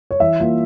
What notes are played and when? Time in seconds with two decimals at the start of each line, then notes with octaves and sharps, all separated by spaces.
0.11 C#5
0.20 E3 E5
0.40 A#3 F4